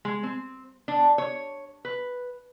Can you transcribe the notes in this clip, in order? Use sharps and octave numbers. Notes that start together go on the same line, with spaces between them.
G#3
C4
D4
C#5
B4